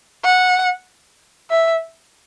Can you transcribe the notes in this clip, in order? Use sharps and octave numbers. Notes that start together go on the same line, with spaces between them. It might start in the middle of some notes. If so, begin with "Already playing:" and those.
F#5
E5